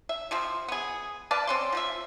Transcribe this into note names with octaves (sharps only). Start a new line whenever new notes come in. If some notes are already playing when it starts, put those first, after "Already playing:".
E5
C3 F3 C4
B3 G#4
B4 D5 F5 A5
C4 C#4 C6
F3 F4 E5